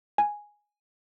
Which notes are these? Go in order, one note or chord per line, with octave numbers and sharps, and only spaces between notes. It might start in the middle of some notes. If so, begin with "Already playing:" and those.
G#5